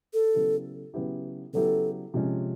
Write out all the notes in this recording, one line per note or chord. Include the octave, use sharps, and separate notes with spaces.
A4
C#3 F#3 B3 E4 G4
C#3 F#3 B3 E4 G4
C#3 F#3 B3 E4 G4 A4
C3 F3 G#3 C#4 F4